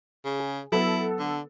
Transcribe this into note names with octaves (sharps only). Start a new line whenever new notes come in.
C#3
G#4
F#3 B3 E4 A4
D3